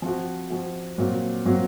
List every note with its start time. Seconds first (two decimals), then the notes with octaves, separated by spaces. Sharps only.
0.02 F3 C4 F#4
0.50 F3 C4 F#4
0.98 A#2 F#3 C4 F#4
1.46 A#2 F#3 C4 F#4